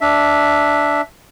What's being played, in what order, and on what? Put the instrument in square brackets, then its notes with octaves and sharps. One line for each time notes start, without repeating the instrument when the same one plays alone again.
[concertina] D4 E5